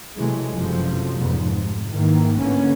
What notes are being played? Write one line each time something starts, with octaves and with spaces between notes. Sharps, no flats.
C3 E3 F#3 G#3 A3
F#1 G2 C3 F3 F#3 A3
F1 F2 G#2 C#3 B3
C3
G#2 D#3 E3 A#3
A1 D3 A#3 B3 C#4